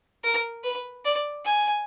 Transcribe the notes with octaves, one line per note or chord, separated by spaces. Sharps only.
A#4
B4
D5
G#5